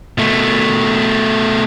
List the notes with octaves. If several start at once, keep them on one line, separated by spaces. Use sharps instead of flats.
B2 A3